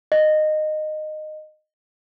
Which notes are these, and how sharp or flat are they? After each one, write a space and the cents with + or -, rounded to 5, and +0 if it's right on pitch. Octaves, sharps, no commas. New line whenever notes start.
D#5 -15